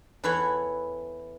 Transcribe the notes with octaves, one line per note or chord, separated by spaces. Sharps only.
E2 E3 E4 A4 C#5 F#5